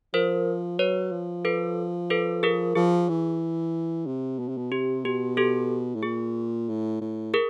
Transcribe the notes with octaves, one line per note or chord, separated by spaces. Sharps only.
F3 A#4 C5
F#3 B4 C#5
F3
A4 B4
A4 B4
G#4 A#4
F3 G#4
E3
C3
B2
C3
B2
C3 G4
B2 G4
G4 A4
A2
A#2 G#4
A2
A2
G#4 A#4